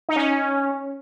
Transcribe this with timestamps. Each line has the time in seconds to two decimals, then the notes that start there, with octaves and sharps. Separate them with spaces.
0.09 D#4
0.16 C#4